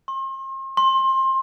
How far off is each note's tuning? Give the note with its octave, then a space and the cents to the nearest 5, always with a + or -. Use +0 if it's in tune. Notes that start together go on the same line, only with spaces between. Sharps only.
C6 +40
C6 +25